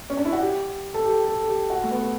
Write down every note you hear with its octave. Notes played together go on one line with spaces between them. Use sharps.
C#4
D4
E4
F#4
G4
A4
G4
A4
G4
F#4
A3
B3